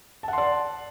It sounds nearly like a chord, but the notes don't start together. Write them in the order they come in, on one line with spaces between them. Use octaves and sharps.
A5 F#5 C6 D5